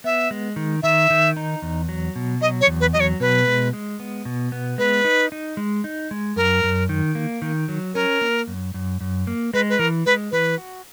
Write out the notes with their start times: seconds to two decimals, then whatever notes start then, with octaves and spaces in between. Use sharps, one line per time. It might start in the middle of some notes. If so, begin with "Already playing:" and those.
0.04 B3 E5
0.31 G#3
0.56 D#3
0.83 D#3 E5
1.10 D#3
1.37 D#4
1.62 E2
1.89 F#3
2.16 B2
2.41 F#3 D#5
2.61 C#5
2.67 E2
2.80 B4
2.93 F#3 D#5
3.00 C#5
3.20 B2 B4
3.47 G#3
3.73 G#3
4.00 B3
4.25 B2
4.52 B3
4.78 G#3 B4
5.05 D#4
5.32 D#4
5.57 G#3
5.84 D#4
6.11 G#3
6.36 F#2 A#4
6.64 F#2
6.89 D#3
7.15 A#3
7.42 D#3
7.68 F#3
7.94 C#4 A#4
8.21 A#3
8.48 F#2
8.74 F#2
9.01 F#2
9.27 A#3
9.54 G#3 B4
9.70 B4
9.79 E3 A#4
10.06 G#3 B4
10.32 E3 B4
10.58 F#4